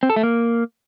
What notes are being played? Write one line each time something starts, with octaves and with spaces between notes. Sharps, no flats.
C4
A4
A3
A#3